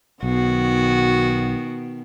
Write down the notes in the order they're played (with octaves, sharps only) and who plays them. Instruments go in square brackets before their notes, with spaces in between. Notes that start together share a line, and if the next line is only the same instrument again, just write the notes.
[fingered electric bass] B1 [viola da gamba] B2 D#3 [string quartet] F#4